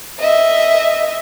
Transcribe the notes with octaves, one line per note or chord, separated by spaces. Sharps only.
D#5 E5